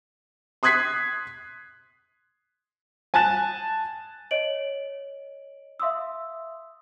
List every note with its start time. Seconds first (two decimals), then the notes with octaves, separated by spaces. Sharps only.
0.63 C6 D#6 F#6 G#6 B6 C7
3.14 G#5 A5 F#6 A6 E7
4.31 C#5 D#5 D7 F#7
5.80 E5 F5 C6 D#6 E6